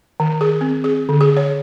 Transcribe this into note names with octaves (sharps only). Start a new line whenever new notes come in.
D#3
G#4
C4
G#4
D3
G#4
C#5